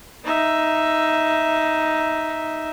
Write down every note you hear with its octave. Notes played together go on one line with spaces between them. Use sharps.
D#4 E5